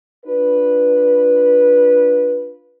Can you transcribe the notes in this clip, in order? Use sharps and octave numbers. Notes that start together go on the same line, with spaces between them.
D4 F4 B4